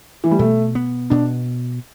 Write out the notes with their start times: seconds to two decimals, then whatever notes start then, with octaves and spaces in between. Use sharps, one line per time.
0.24 E3
0.31 G3
0.39 B2 A3
0.75 B3
1.10 B2 D4